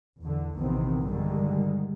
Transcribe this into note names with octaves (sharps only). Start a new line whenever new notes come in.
E2 D3
A#1 C3 D#3 E3 B3 C4
G2 D3 D#3 G3 G#3